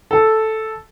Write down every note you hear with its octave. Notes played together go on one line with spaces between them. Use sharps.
A4